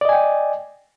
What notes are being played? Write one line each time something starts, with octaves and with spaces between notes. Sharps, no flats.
D5 D#5 G5 G#5